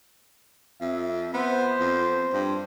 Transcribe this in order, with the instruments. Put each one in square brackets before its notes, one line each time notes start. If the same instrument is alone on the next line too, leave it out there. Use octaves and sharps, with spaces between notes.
[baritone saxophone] F2 [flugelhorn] E5
[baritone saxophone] B3 [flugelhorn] C5
[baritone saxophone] F2
G2